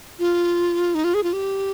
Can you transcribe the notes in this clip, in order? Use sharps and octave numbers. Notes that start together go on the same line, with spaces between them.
F4
D#4
F4
G#4
F4
G4